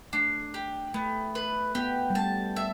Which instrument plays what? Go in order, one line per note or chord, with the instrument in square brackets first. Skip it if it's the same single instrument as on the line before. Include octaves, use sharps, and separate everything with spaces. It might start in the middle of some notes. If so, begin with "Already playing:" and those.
[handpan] A3 [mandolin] D4
[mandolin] G4
[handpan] A3 [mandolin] B3
[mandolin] B4
[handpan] B3 [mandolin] G4
[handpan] G3
[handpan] A3 [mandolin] A5
[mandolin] E5